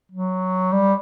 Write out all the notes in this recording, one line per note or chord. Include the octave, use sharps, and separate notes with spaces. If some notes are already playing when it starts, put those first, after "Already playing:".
F#3
G3